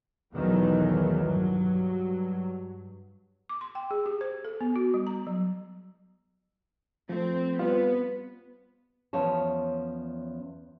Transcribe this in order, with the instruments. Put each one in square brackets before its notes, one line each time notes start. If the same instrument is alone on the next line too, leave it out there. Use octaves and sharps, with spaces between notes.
[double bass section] B1 E2 D#3 E3 F#3 A3
G2 F#3
[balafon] D6
C6
G5
G#4
G4
C5
A4
B3
F#4
G3
A#5
F#3
[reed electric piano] F3 A3 [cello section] C4
[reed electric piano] G3 C4 F4 [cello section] B3 [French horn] B4
[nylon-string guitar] E2 F3 C#4 C#5 A5